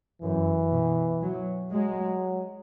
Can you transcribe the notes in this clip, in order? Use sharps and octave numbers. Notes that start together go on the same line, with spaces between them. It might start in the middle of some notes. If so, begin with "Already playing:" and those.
F#2 E3
B2
F#3
F#3 G#3